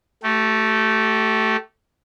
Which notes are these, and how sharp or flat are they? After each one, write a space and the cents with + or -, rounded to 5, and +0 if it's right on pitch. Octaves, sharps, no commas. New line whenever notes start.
A3 +0 G4 -30